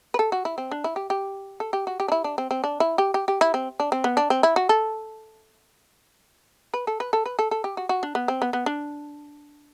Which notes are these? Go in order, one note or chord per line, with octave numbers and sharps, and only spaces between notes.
B4
A4
F#4
E4
C4
D4
E4
G4
G4
A4
G4
F#4
G4
D4
E4
D4
C4
C4
D4
E4
G4
G4
G4
E4
C4
D4
C4
B3
D4
C4
E4
F#4
A4
B4
A4
B4
A4
B4
A4
A4
G4
F#4
F#4
D4
B3
C4
B3
B3
D4